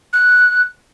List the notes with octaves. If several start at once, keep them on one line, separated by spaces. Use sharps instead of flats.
F#6